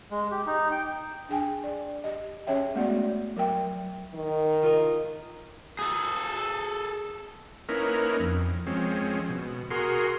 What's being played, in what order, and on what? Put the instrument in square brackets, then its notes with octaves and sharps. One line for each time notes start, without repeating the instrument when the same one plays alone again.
[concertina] G#3
G4
D#4
G5
[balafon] D4 G#4 G5 G#5
D5
G4 D#5
C#4 G#4 C#5 E5 G5
G#3 A3 B3 F#4 D5
F#3 A#4 E5 G5
[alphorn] D#3
[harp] F4 A#4 D#5
[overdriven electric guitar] G#4 A4
[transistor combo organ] A#3 C#4 D#4 E4 A#4 B4
F2
F3 G#3 C4 C#4
B2
F#4 G#4 A#4 C6